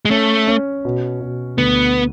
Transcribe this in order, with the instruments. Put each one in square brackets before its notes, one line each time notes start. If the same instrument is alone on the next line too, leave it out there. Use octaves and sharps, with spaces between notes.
[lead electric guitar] G#3
[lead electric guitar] A3 [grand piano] C#4
[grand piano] C#4
B2
B2
[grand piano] D2 [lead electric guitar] B3